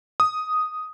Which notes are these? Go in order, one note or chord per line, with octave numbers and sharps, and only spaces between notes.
D#6